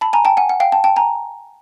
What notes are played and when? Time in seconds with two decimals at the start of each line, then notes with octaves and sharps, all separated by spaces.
0.01 A5 B5
0.13 G#5 A#5
0.25 G5 A5
0.37 F#5 G#5
0.49 F#5
0.60 F5 G5
0.72 G5 A5
0.84 G5 A5
0.96 G#5 A#5